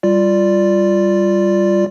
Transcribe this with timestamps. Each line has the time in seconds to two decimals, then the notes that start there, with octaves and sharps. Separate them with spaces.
0.03 G3 F4 D5